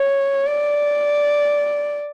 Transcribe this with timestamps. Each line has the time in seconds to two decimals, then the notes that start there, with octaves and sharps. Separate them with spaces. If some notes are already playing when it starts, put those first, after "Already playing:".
Already playing: C#5
0.46 D5